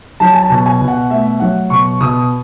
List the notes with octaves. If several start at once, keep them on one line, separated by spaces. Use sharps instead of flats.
F#3 A5
G#5
A5
B2
A5
G#5
B2
F#5
A3 E5
F#3 F#5
B2 C#6
B2 D#6